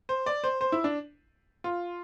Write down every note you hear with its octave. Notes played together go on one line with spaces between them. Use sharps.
C5
D5
C5
C5
E4
D4
F4